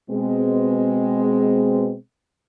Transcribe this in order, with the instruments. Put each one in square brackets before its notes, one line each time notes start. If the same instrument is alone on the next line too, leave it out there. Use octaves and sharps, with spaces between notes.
[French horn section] B2 G#3 C4